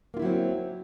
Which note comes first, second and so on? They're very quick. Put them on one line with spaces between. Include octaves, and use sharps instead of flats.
A#3 F4 E4 F#3 C4